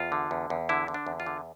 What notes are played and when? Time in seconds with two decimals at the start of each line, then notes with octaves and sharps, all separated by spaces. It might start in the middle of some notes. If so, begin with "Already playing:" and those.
Already playing: E2 F4
0.12 D3
0.31 E2
0.50 E2
0.69 D3 E4
0.88 D3
0.94 D4
1.07 E2
1.20 F4
1.26 D3